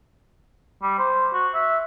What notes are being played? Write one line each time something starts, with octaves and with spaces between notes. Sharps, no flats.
G3
C5
F#4
E5